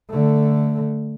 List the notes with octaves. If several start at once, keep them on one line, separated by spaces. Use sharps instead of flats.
D3 A3